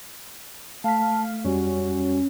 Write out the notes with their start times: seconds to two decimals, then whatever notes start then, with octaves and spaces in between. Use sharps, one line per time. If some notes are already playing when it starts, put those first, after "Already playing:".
0.84 A3 F5 A5 B6
1.44 F2 G3 C#4 F#4